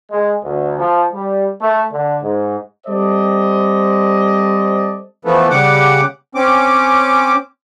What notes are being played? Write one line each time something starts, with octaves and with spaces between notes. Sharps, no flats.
G#3
D2
F3
G3
A3
D3
G#2
G3 C4 A4 C5 D5 D#5
E3 F3 A3 B3
C#3 G3 F#5 D6
C4 C#4 D6